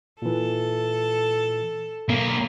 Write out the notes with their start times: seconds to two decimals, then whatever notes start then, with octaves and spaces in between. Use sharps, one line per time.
0.22 A#2 E3 A4
2.09 B1 A#3